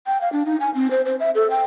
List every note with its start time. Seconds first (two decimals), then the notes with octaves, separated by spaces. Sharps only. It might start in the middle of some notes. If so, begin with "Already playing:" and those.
0.07 G5
0.21 F5
0.32 D4
0.46 D#4
0.60 G#5
0.75 C4
0.91 C5
1.05 C5
1.20 E5
1.35 A4
1.50 G5